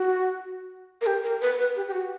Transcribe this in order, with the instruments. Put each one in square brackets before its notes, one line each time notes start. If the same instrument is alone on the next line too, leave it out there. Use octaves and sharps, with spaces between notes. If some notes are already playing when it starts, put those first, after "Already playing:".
Already playing: [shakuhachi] F#4
A#4
G4
A#4
B4
B4
G4
G4
F#4